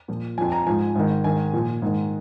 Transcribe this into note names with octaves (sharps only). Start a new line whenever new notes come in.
A#2 F3
F2 F3 G#5
A#5
G#2 F3 G#5
G#2 D#3
G#2 D#3 G#5
A#2 F3
G#2 D#3